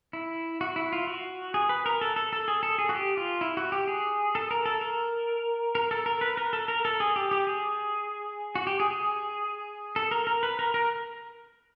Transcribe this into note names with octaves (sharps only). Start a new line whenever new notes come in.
E4
F#4
E4
F4
F#4
G#4
B4
A#4
A4
A4
A4
G#4
A4
G#4
F#4
G4
F4
E4
F#4
G4
G#4
A4
A#4
A4
A#4
A#4
A4
A#4
B4
A#4
A4
A#4
A4
G#4
G4
G4
G#4
F#4
G4
G#4
G#4
A4
A#4
A#4
B4
A#4
A#4